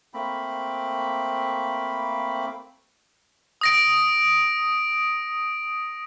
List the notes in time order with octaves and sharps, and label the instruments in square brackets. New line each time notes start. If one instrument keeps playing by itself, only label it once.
[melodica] A3 A#3 C4 B5
[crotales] D#6 A#6 D7